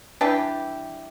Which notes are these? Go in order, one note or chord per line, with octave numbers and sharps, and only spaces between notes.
E3 G3 D4 G4